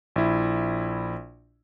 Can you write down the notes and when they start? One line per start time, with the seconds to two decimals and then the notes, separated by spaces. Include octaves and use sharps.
0.16 A#1 E4